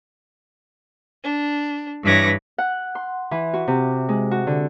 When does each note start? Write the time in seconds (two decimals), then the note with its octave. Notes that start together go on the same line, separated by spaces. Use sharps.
1.24 D4
2.03 G2 E3 B4 C#5 D6 A#6
2.58 F#5
2.95 C6
3.31 E3
3.54 F#4
3.68 C3
4.09 G#3
4.31 F#4
4.47 D3